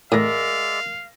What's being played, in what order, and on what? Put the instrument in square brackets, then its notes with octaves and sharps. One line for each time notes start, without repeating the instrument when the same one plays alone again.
[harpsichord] A2 [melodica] G#3 D5 E5 [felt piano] A#4 A#6 [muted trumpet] F5